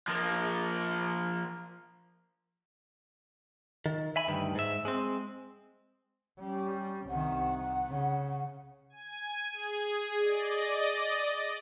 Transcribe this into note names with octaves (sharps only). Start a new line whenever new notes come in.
F3 A#3
D#3
E5 G#5 B5
D2 G2 D#3
G#2 E5
G#3 C4
G3 C#4
C2 D#3 F#5
C#3
G#5
G#4
D5 D#5